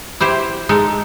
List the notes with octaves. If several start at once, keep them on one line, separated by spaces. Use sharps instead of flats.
E4 G4 C5
G#3 D#4 A4